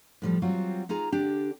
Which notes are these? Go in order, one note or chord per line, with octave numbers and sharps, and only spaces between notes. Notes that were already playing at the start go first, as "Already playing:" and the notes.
A2 F3 G3
F#3 G3 C4 F4 F#4
D#4 F4 G#4 A#5
D3 D4 G4